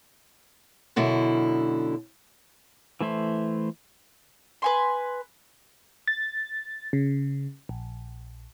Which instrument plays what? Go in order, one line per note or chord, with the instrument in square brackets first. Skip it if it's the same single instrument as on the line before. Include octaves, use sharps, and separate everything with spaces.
[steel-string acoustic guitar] F#2 B2 D3 E4
[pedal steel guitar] E3 A3 E4 C5
[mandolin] B4 G#5 C6
[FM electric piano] A6
C#3
A#1